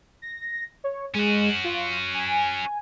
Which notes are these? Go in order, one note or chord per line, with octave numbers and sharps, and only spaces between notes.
A#6
C#5
G#3 C#4 F#4
F4
G#5